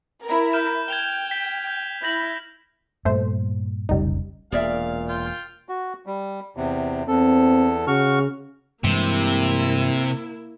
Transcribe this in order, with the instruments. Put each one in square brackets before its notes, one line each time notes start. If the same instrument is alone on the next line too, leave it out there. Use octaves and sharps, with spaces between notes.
[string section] E4 A#4
[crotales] F6 G6 E7
[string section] G5 [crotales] G#6 F7 G7
[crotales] B6
G6
[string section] E4 [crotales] G6 A#6 F#7
[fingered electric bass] G2 A#2 [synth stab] A3 C5
[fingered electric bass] F1 B1 C#3 [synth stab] G3 D#4
[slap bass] E1 A#3 [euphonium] A#2 [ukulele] G#4 D5 E5 [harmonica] F5
[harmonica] F4 G5
[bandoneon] F#4
G3
E2 C3
[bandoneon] E2 A4 [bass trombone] C4
[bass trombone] C#3 [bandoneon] F#4 C#6 F6
[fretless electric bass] G2 E3 G#3 [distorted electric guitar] C3 [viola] A#3 E4